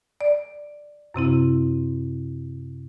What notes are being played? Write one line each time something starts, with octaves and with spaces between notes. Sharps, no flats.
D5
F#2 C3 C4 E4